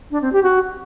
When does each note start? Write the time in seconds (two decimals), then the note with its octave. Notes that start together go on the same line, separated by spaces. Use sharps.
0.11 D4
0.22 C4
0.33 G4
0.43 F#4